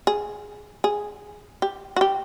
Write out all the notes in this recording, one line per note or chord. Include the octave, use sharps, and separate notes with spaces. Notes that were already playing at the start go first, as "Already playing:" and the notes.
G#4
G#4
G4
F#4
G4